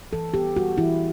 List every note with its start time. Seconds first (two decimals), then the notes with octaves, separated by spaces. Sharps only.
0.13 E3 A4
0.34 B3 G4
0.56 G3 F#4
0.78 E3 E4